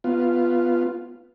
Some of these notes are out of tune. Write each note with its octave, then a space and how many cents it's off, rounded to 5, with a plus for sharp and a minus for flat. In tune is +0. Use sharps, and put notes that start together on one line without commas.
B3 +0 F4 -5